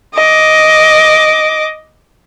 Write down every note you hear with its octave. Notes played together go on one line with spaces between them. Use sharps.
D#5 D6